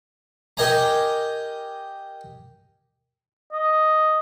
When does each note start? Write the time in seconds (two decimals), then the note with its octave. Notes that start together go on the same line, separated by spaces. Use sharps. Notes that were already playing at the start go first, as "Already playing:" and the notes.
0.57 G4 A#4 D#5 G#5 A#5
3.53 D#5